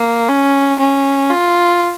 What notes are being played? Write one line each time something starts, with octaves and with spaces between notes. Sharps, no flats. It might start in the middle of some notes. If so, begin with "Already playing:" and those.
Already playing: A#3
C#4
C#4
F4